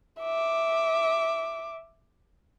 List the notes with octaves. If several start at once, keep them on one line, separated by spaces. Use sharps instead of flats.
E5 D6